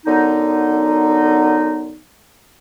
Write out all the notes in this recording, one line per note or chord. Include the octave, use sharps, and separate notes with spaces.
F#2 D3 B3 D#4